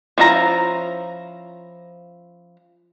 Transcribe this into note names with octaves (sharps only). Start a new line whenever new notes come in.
F3 C#4 E4 G#4 A#5